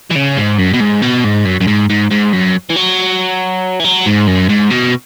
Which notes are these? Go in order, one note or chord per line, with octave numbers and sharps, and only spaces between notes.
E3
C#3
G#2
F#2
B2
G#2
B2
G#2
F#2
F#2
G#2
G#2
G#2
F#2
E3
F#3
E3
F#3
G#2
F#2
G#2
B2